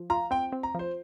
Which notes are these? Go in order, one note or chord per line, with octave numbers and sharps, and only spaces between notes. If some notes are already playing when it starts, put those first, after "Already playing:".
Already playing: F3
F4 A#5
C4 G5
C4
A#5
F3 C5